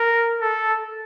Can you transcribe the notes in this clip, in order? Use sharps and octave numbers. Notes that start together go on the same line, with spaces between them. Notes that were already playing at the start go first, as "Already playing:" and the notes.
Already playing: A#4
A4